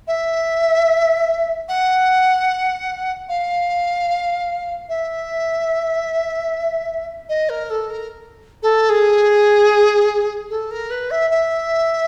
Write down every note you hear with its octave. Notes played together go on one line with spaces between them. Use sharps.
E5
F#5
F5
E5
D#5
A#4
A4
A#4
A4
G#4
A4
A#4
B4
E5
E5